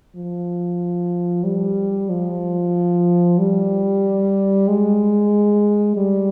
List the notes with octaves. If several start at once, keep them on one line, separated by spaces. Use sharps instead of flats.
F3
G3
F3
G3
G#3
G3